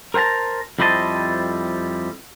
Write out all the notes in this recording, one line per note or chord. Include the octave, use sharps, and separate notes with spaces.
A#4 C5 G5 A5 A#5
F2 G3 E4 C5 D#5 A5